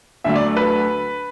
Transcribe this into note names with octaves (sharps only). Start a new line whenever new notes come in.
D2 D3 F#3 A3 E5
D5
B4